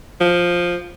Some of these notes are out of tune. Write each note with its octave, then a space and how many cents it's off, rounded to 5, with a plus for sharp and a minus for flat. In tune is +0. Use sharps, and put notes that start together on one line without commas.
F3 +5